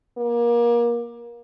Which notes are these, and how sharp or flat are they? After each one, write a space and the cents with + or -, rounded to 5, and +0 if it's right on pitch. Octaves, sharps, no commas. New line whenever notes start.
A#3 +25